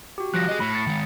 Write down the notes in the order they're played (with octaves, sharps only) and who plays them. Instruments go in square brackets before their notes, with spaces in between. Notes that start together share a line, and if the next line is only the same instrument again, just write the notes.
[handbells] F#4 G4
[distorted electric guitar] F3 G3 [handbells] F#6 A#6
[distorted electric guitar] G#4 D#5
[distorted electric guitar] A2 [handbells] B5
[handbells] A6 C#7
[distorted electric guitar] D#3 G#3